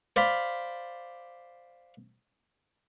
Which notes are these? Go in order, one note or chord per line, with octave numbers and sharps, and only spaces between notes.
C5 D5 F5 B5